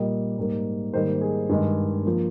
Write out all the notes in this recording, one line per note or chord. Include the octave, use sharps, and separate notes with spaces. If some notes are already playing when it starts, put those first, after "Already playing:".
Already playing: A#2 G3 A#3 D#5
G#2 G3 A#3
G#2 D#3 G3 A#3 C5
G#4
G2 D#3 G#3
F3 A#3